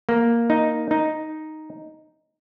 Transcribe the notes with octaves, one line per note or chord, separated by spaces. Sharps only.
A#3
D#4
D#4